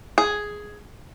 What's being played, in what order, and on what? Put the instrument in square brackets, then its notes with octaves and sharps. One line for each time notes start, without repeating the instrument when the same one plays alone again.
[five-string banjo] G#4